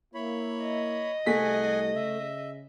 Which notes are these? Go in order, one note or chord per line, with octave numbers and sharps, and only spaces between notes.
A#3 E4 C#5 B5
D#5
C2 A3 G#4 F#5 G#5 B6
C#3 E5